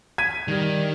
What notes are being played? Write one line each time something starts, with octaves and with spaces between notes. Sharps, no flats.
G#6 B6 D#7
D#3 G3